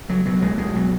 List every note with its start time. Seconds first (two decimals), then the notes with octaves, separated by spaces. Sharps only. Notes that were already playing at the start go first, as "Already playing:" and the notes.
0.08 C#2 F#3
0.25 B2 F#3
0.42 B1 G#3
0.58 B1 G#3
0.75 B2 F#3